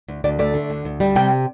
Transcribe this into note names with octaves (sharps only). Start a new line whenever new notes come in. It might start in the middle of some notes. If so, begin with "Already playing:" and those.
D2
D2 D5
A3 D5
D3
D2
D2
G3
C3 G5